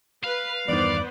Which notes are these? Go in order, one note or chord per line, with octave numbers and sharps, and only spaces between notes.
B4 F5
E2 G2 D#3 B3 B4 C5 D5